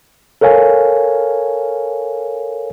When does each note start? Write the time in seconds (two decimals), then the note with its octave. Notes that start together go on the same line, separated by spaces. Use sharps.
0.41 A4 A#4 C#5 F5 G#5